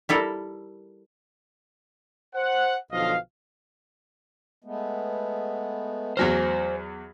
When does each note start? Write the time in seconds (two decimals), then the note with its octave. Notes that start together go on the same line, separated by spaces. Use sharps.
0.09 G3 E4 A4 A#4
2.35 C5 F#5
2.92 B1 B2 D3 F3 D#5 F5
4.64 G#3 A3 B3
6.17 E2 F#3 C5 G#5 F6